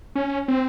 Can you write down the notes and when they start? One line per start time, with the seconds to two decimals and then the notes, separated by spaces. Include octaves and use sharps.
0.15 C#4
0.48 C4